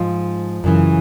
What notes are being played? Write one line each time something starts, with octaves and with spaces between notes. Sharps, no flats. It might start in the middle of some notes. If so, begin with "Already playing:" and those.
Already playing: G#2 F3 F4
F#2 C#3 E3